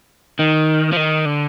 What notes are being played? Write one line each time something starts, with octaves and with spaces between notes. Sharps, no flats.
D#3
F3
D#3
D3